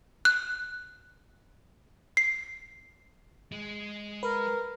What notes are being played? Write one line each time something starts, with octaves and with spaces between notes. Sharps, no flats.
F#6
C7
G#3
A#4 B4